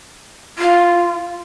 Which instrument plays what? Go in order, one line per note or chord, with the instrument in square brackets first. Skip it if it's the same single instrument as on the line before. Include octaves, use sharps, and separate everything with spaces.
[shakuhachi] F4